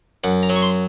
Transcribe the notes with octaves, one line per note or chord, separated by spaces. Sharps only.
F#2 F#5
A#5
F#3
C#6
C6